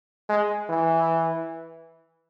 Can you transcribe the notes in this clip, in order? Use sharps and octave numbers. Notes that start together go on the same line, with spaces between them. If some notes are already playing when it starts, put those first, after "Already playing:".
G#3
E3